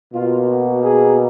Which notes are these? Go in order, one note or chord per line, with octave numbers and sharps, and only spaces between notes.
B2 A#3 F4
F#4
G#4